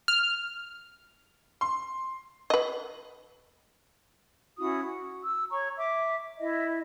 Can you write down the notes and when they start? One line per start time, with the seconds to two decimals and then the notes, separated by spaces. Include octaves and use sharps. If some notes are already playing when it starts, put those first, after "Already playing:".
0.08 F6
1.61 C6
2.50 B4 D#5
4.59 C#4 E4 F#4 D#6
4.85 F#4
5.23 E6
5.51 C#5 A#5 C#6
5.78 E5 D6
6.39 E4 D#5 E5